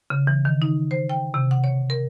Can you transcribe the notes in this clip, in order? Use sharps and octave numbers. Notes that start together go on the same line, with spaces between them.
C#3
E3
D#3
D#4
C5
G5
C3
F#5
C#5
A#4